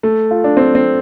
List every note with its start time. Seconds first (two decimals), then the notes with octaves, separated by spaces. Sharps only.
0.03 A3
0.31 F4
0.44 D4
0.57 C4
0.75 C4